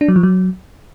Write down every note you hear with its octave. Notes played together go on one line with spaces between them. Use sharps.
D4
F#3
F3
F#3